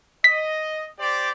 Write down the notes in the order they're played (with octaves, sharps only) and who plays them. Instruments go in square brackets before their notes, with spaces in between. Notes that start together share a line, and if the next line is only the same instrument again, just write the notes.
[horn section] D#5 [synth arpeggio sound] B6
[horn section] G4 C5 D5